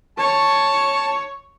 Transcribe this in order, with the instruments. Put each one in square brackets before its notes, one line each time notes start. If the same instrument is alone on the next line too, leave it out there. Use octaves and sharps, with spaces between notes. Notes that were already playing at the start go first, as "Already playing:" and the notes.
[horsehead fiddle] C#5 [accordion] A5